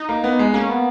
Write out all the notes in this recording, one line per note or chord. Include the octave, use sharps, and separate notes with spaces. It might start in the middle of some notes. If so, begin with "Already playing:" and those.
Already playing: D#4
A#3
B3
G#3
A#3 C#4
B3